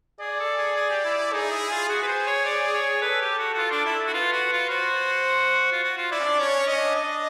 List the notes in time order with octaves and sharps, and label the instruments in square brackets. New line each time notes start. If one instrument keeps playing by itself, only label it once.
[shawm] G#4 [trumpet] D5
[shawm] A4
G#4
G#4
G4
E4
E4
[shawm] D#4 [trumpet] G#4
[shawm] E4
F4
[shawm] F#4 [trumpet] G#4
[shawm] B4
C5
C#5
D5
C#5
[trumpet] A4 [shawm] B4
[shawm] G4
F#4
F#4
F4
D4
E4
F#4
[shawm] F4 [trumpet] B4
[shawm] F#4
F4
[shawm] F#4 [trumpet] C5
[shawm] F4
F#4
F4
[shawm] E4 [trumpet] D5
[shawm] C#4
D4
[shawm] C#4 [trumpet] C#5
[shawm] C#4
[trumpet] D#5
[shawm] D4
[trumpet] D#5